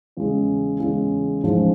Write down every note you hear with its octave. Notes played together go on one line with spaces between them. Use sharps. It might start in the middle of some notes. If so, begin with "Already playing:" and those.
E2 C#3 E3 G#3
E2 C#3 E3 G#3
A1 G#2 F3 G#3 C#4